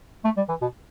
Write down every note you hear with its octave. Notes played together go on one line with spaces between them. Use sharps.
A3
G3
E3
B2